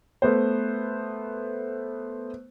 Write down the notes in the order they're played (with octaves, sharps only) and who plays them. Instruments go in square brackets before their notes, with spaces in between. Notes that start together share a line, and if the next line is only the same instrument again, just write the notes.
[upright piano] A3 B3 C5